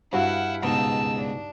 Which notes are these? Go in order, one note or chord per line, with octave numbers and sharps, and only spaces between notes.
G2 E4 F#4 F5 F#5
C#2 G#2 B2 D#4 A5 E6
D4